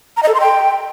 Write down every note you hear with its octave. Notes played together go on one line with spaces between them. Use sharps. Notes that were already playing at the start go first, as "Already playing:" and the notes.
A#5
D#5
A4
C6
G5